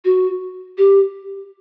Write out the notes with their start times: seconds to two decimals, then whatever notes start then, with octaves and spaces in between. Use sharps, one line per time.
0.05 F#4
0.78 G4